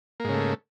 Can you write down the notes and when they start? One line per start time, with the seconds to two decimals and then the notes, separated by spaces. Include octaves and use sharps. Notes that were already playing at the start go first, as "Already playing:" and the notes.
0.20 A#3
0.24 G#2
0.29 C#3
0.34 A3